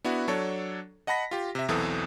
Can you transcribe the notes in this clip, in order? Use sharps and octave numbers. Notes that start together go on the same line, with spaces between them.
B3 D4 E4 F#4
F#3 D4 A4 C#5
D#5 F#5 A5 B5 A#6 B6
F4 G4
C3 E5
B1 E2 E3 C4 A4 D#6